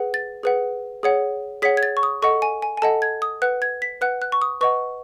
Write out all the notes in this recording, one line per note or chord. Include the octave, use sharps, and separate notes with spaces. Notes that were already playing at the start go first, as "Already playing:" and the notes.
Already playing: G#4 B4 F#5
A6
G#4 B4 F#5
G#4 C#5 F#5
G#4 C#5 F#5 B6
G#6
A6
C#6
D#6
A4 D#5 F#5 C#6
G#5
G#5
G#5
A4 D#5 F#5 A5
G#6
D#6
B4 F#5 F#6
G#6
B6
B4 F#5 F#6
F#6
C#6
D#6
B4 D#5 F#5 C#6